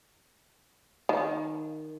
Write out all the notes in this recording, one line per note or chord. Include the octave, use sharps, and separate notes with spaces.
D#3